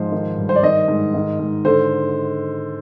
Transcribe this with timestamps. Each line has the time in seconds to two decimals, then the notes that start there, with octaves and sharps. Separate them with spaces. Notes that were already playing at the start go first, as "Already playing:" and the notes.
Already playing: G#2 F3 C5
0.12 D#3
0.37 G2
0.49 C5
0.55 D5
0.63 D#3 D#5
0.88 G#2
1.14 D#3
1.39 G#2
1.65 D3 C5